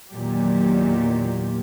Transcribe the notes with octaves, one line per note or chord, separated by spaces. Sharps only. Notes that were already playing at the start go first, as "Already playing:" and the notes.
E2 A#2 D#3 F#3 G4